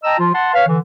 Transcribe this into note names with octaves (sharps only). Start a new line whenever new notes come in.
D#5 G5 A5 A#5 E6
F3 F4
F#5 A5 C6
B4 C#5 F5
D3 E3